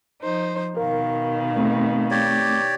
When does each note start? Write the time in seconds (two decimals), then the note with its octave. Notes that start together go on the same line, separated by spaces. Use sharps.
0.21 F3 D#4 C5
0.77 B2 D#3 A#4 F5
1.57 A3 C4
2.11 G4 C#5 D5